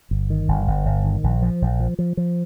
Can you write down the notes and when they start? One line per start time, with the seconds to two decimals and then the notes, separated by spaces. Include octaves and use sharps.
0.11 G1
0.30 D#3
0.48 G1
0.67 G1
0.86 G1
1.04 D#3
1.24 A#1
1.42 F3
1.62 A#1
1.80 F3
1.99 F3
2.17 F3